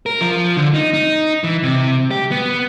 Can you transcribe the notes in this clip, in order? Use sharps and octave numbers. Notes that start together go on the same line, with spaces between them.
A#4
F3
D3
D#4
D#4
E3
C3
G4
B3